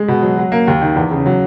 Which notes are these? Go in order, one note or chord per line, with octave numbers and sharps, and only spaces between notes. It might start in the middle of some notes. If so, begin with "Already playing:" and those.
Already playing: G#3
B2
F#3
F#3
A#3
D#2
D#3
E2
C#3
F#3